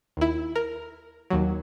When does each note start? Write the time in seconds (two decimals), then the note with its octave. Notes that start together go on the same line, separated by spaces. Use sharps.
0.17 D#2 E4
0.56 A#4
1.30 D#2 F#3